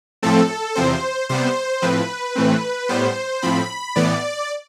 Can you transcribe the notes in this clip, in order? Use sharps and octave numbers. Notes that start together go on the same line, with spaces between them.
A2 F3 A3 C4 A4
E2 C3 F3 C4 C5
C3 G3 B3 C5
A2 F3 C4 B4
A2 E3 A3 C4
A2 G3 B3 C5
A2 F3 C4 B5
A2 E3 B3 D5